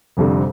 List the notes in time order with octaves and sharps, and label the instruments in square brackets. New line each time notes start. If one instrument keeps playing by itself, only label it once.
[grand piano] F1 F2 D3 G3 C4